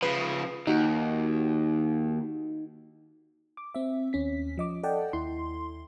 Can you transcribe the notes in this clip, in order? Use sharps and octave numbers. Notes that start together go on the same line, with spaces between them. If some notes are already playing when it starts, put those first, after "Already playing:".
C#3 F3 B4
D#2 D#4 F#4
D6
C4 E5
D#2 C#4 B6
F3 D#5 D6
A4 D5 D#5 F#5 G5 A5
D#2 E4 C6